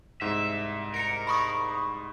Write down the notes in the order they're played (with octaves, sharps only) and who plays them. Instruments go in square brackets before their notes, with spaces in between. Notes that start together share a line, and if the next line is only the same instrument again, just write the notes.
[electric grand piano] C2 G#2 [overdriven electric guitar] E5
[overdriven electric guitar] A#4 [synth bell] C#7 D7
[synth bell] B5 C#6 D#6